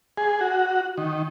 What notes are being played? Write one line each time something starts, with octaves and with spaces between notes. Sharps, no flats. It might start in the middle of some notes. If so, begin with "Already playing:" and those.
G#4
F#4
D#3